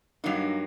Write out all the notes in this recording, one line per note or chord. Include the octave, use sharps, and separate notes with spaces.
G2 F#3 A#3 D#4